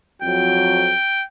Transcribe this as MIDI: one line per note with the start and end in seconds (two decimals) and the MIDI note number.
0.22 0.94 41
0.22 0.94 54
0.22 1.24 79